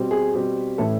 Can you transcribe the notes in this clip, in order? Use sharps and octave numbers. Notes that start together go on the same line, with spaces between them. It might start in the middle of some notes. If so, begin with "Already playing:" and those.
Already playing: B2 G3 C4
G#4
B2 G3 C4
A2 E3 A3 C#4 E4 A4